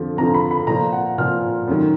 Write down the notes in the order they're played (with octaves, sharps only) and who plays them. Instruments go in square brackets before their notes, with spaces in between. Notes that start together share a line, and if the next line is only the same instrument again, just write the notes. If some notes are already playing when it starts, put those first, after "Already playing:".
Already playing: [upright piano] F2 D3 F3
F2 D3 F3 A#5
B5
B5
A#2 F3 A#5
F#5
A#2 F3 F6
F#2 D#3